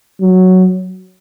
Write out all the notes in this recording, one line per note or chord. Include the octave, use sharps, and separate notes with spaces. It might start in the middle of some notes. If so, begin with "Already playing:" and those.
F#3